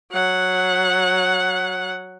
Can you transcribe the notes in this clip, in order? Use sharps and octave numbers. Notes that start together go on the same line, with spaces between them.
F#3 F#5